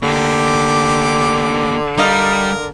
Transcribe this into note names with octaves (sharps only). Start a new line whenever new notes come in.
D2 D3 A#3 G4 D6
G3 D#4 A#4 D#5 F5